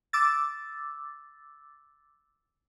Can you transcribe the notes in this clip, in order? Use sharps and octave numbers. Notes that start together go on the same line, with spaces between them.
D6 E6 A6